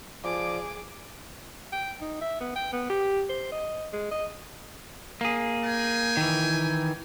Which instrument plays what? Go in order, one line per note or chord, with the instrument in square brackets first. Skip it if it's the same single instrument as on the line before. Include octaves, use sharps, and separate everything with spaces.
[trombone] F3 [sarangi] G#4 [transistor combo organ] D5 [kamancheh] D6
[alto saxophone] G5
D#4
E5
B3
G5
B3
G4
C5
D#5
G#3
D#5
[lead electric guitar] A#3 G#4
[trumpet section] G5 G#5
[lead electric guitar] D#3 E3